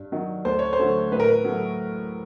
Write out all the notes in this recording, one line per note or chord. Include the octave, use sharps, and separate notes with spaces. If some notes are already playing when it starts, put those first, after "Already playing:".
Already playing: G2
D#3 F#3
D2 C5
C#5
C5
D3 F#3 A3
A2 B4
A#4
B4
F#3 A3